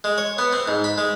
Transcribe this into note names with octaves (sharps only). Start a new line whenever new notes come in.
G#3
C#5
B3
C4
G#2
B5
G#3